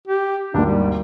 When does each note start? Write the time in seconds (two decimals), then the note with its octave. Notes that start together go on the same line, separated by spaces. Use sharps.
0.08 G4
0.54 G#1 D#2 D4
0.66 G3